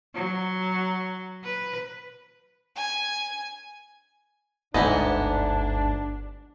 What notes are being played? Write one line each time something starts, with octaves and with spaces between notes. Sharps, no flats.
F#3
B4
G#5
G1 D2 G#2 B3 D4 E4 G4 D#5